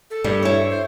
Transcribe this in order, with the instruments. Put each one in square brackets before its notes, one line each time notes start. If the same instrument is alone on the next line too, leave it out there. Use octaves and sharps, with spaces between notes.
[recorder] A4
[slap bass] G2 [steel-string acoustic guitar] G3
[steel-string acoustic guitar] E4 C#5
[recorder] C5